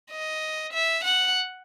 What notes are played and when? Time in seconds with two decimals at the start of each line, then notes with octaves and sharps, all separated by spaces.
0.10 D#5
0.73 E5
1.04 F#5